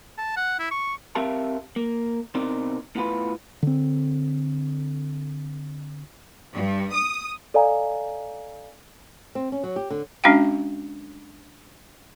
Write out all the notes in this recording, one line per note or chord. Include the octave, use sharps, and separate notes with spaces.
A5
F#5
E4
C#6
C4 G4 A#4 E5 F5 A5
A#3
B2 C4 D#4 A#4 D5
A2 B3 F4 B4
D3 C4
G2
D#6
A4 D5 D#5 F5 G#5 A#5
C4
C#4
F#3
G4
D3
G#3 C#4 D4 F#4 F5 G5